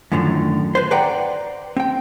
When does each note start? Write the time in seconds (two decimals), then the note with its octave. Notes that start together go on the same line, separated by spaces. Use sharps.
0.12 F#2 A2 D3 D#3 F3
0.75 B4 C5
0.91 B4 C5 D5 F#5 G5 A#5
1.77 C4 G5